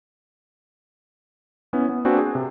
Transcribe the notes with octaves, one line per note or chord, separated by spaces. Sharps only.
B3 C#4 E4
B3
A#3 C4 D4 F#4 B4 G#5
G#4
C3